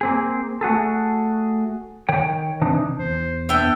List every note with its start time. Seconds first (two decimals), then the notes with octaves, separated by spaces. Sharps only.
0.01 A#3 C4 G#4
0.61 A3 F#4 G#4 A4
2.09 D#3 C#5 G5
2.61 C3 E3 D4 D#4
2.98 E2 C5
3.49 B3 D4 G5 E6